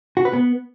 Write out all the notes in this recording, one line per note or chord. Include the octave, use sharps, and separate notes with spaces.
F#4
B4
B3